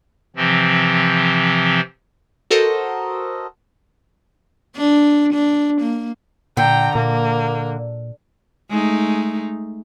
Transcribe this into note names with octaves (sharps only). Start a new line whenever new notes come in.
C3 E3 F3 C4
F#4 A4 A#4 C5 D#5
D4
D4
A#3
A#2 D3 G5 A#5
A#2 A#3
G#3 A3 D#4